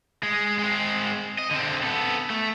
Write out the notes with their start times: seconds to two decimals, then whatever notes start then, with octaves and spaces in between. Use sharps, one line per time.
0.23 G#3
0.59 G#3 C4
1.38 D#5
1.51 D3 C4
1.83 B3 A4
2.30 A3